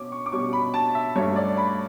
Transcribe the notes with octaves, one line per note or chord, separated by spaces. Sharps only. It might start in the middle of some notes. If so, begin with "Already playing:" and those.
Already playing: B2 C#4 D6
C#6
D6
B2 G3 C#4 C#6
B5
A5
E5
G2 F#3 A3 C#4 C#5
D5
B5